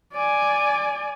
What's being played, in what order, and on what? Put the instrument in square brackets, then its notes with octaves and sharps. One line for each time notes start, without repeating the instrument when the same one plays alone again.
[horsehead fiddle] D5 G#5